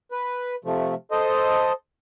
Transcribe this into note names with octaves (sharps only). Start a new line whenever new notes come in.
B4
C3 F3 A3
A4 C5 D#5